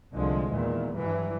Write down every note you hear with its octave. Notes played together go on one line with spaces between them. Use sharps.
C2 D3 F3 G#3
E2 A#2 D#3
G2 E3 F#3 G3